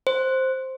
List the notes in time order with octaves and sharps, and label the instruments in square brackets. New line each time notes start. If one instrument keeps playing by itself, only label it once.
[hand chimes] C5